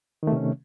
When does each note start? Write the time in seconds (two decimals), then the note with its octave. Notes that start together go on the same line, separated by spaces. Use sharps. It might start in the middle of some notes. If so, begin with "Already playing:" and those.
0.23 D#3
0.27 A3
0.32 C3
0.37 C#4